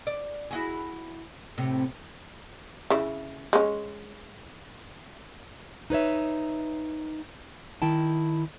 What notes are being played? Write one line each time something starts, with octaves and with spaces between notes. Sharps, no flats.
D5
E4 F#4 G#4
A2 C3
C#3 E4
G#3 C#4
D#4 B4 C#5 E5
D#3 E4 G5 A5